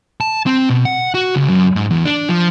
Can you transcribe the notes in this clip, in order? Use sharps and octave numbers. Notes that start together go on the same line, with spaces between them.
A5
C4
B2
F#5
F#4
C#2
F#2
G#2
E2
D4
F3